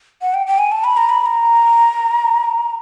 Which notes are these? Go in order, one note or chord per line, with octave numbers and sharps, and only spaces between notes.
F#5
G5
G5
G#5
A5
B5
A#5
B5
B5
A#5